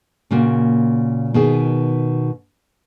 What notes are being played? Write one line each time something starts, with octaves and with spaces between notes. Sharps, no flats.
A#2 C#3 A#3 F#4
B2 D#3 G#4